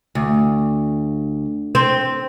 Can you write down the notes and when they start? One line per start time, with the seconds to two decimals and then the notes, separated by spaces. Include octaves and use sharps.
0.15 D2
1.75 C4